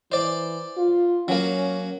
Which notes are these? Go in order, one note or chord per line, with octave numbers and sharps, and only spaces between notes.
E3 C5 D5
F4
F#3 A#3 C#4